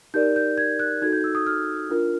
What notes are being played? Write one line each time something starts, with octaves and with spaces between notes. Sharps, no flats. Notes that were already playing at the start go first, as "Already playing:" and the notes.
D#4 G4 A#4 D5 G6
G6
G#6
F#6
D#4 F#4 A4 G#6
G6
E6
D#6
F6
D4 F4 A#4